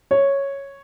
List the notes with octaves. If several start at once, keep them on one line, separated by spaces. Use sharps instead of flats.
C#5